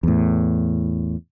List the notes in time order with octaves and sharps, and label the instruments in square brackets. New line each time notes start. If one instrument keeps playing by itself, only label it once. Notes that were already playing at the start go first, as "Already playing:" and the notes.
[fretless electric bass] E2 A2